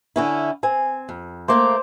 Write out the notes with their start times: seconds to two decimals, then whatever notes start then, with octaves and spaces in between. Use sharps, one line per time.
0.16 D3 C#4 E4
0.63 C4 G#5
1.09 F2
1.48 A3 A#3 C5 D6